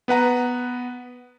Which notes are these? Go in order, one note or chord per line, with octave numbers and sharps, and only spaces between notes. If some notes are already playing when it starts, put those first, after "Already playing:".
B3 B4 F#5 A#5